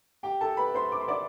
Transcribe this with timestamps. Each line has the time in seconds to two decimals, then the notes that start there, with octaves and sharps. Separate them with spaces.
0.23 G4 G5
0.41 A4 A5
0.57 B4 B5
0.74 C5 C6
0.92 D6
1.01 C6
1.08 D5 D6